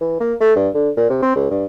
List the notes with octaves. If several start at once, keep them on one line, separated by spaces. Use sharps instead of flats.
E3
A#3
A3
G2
D3
A#2
C3
C4
C#2
G2